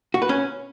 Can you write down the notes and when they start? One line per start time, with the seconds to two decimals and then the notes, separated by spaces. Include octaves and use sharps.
0.14 F#4
0.22 B4
0.29 C#4